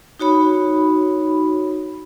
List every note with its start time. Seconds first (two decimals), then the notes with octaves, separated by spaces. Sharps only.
0.20 D#4 F#4 C#5 B5